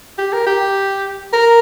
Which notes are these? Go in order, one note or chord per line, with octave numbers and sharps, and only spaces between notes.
G4
A#4
G4
A#4